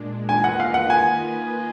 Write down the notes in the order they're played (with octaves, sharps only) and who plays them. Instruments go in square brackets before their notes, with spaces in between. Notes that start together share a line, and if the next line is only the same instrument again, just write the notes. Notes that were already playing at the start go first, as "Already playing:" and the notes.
Already playing: [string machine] A#2 G#3 D4
[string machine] D#3 A#3 F4 B4 D#5 [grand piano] G#5
[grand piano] F#5
F5
F#5
G#5